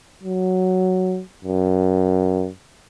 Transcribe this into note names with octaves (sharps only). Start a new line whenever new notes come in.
F#3
F#2